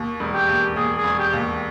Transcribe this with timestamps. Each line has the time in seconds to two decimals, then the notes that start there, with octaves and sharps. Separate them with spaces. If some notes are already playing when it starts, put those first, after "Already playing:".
Already playing: D#2
0.20 E1
0.34 G4
0.48 D#2
0.76 D#2 G#4
0.97 G#4
1.04 E1
1.19 G4
1.33 D#2